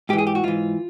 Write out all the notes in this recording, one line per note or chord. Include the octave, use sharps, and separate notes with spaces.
G#2 E3 G4
G#4
G4
F#4
G#2 E3 F4